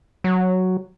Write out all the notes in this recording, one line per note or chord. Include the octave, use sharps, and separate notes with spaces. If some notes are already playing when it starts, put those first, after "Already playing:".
F#3